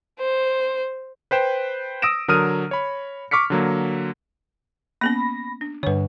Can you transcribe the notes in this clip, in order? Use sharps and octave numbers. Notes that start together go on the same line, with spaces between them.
C5
B4 C5 G5 E7
D#6 E6 A#6 D7 E7
D3 F#3 A#4 D#6 F6 D#7
C#5 B5
C#6 D6 F6 B6 C#7
D3 F#3 A#3
A#3 B3 C#4 B5 A#6
D4
G2 D3 B4 C#5